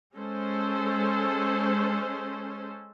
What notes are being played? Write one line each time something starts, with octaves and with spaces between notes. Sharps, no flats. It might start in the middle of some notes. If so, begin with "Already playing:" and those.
G#3 C#4 A4 C5